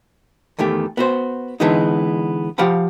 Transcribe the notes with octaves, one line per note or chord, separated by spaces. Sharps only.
E2 D#3 A3 G4
B3 F#4 C5
D3 E3 G#3 B3 D#4
F3 G4 F5 F#5 B5